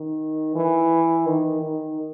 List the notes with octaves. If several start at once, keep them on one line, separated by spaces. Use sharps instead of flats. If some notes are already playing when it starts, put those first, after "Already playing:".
Already playing: D#3
E3
D#3
D#3